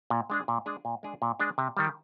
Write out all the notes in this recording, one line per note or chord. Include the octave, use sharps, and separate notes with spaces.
A#2
G#3 D4 G#4
A#2
G#3 D4 G#4
A#2
G#3 D4 G#4
A#2
G#3 D4 G#4
C3
D#3 G3